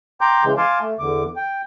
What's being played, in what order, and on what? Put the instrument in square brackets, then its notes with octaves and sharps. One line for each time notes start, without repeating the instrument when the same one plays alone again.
[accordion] G5 A#5 C6 D6 G6
C#3 E3 G#3
F5 G#5 A5 C6 D6
A3
E2 D3 D6
G5